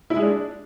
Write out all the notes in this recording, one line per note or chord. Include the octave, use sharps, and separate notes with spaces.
E4
G#3
D4